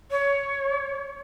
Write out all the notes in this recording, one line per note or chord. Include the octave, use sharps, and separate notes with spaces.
C#5